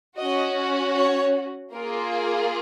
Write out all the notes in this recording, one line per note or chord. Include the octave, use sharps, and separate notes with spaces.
C#4 F#4 D#5
C#5
A#3 F4 G#4 A#4